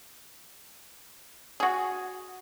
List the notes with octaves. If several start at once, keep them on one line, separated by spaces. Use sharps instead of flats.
F#4 G#4